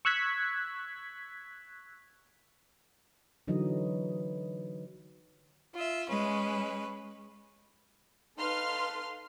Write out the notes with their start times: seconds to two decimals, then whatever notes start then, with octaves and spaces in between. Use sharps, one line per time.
0.05 C#6 E6 F#6 G#6 B6
3.47 D3 E3 F#3 D#4 D#5
5.74 F4 E5
6.08 G#3 C#4 B4
8.39 D#4 A4 B4 F5 C6 F6